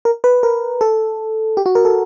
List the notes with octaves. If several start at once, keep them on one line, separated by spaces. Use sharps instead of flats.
A#4
B4
A#4
A4
G4
F#4
A#4
A4